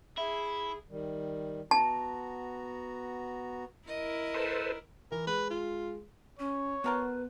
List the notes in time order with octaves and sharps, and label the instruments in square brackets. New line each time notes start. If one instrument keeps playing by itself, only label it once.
[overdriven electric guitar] E4 [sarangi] G#4 [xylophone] E5
[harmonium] D#3 G3
[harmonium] B3 F#4 A#5 [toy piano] A5
[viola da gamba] E4 A#4 [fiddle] D#5
[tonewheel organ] A4 B4 C5
[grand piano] E3 [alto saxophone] A#4
[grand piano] G#3 [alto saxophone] B4
[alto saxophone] F4
[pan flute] C#4 [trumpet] C#5
[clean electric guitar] B3 C6 [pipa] F#4 A#4 A5 [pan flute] B4